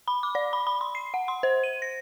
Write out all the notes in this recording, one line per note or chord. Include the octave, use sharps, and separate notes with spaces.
B5
D6
D5
B5
B5
C6
C7
F#5
C6
C5
D#7
A#6